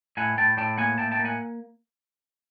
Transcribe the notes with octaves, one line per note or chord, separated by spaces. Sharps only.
A2 F#5 G#5
A2 G5 A5
A2 G5 A5
A#3 F#5 G#5
A2 G5 A5
G5 A5
A#3
F#5 G#5